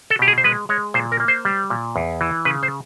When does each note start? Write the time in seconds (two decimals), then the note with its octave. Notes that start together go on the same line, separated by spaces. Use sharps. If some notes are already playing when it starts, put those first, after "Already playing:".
0.10 A4
0.19 B2 G4
0.28 G#4
0.38 C5
0.44 G#3 B4
0.69 G#3 C#5
0.94 A#2 C5
1.12 A#4
1.20 A#3
1.28 C5
1.45 G3
1.70 A#2
1.96 E2
2.21 E3
2.45 C#3 B4
2.63 C5